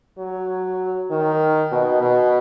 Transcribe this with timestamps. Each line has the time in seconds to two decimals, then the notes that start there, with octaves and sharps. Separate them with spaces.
0.19 F#3
1.11 D#3
1.72 B2
2.02 B2